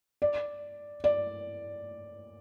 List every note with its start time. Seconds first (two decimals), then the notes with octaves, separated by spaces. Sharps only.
0.22 D5
1.04 D5